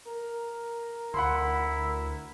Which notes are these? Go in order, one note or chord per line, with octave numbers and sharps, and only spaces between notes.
A#4
D2 E4 F#5 B5 C6